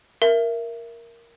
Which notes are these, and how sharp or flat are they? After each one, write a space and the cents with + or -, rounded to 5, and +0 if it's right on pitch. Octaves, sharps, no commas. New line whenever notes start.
A#4 +0 E5 +20